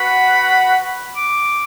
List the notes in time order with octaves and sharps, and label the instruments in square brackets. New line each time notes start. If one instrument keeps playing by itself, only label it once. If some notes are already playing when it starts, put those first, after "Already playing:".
Already playing: [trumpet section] F#4 B4 F#5 [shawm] B5
[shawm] D6